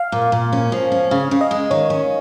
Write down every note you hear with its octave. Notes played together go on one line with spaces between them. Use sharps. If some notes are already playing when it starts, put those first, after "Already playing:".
Already playing: F5
A#2
A#2
C#4
F3
C#4
C#3 F5
C#3
D#5
G#3
D#3 C#5
C#4